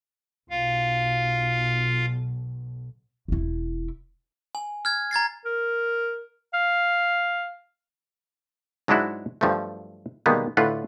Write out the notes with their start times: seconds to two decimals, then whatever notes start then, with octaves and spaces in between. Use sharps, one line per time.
0.50 B1 F4 F5
3.28 E1 E4
4.55 G#5
4.85 F6 G#6
5.11 A#5 G#6 A6 C7
5.45 A#4
6.54 F5
8.88 G#2 F#3 G#3 D4 E4 F#4
9.41 G2 F3 F#3 A3
10.26 B2 D#3 G3 G#3 A#3 B3
10.57 A2 D3 D4 F4 B4 F#5